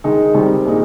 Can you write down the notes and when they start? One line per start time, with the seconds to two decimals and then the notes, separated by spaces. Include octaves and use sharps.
0.04 D#3 G#3 D#4
0.34 D#3 G3 C4
0.66 A#2 G#3 D#4